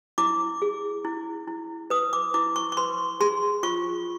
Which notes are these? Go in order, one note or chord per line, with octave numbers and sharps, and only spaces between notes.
E4 D6
G#4
E4
E4
B4 D#6
D6
E4 D6
C#6
C#6
B4 C6
G#4 C6
F4 C#6